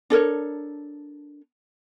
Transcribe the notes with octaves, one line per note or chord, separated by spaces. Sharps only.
D4 A4 A#4 C#5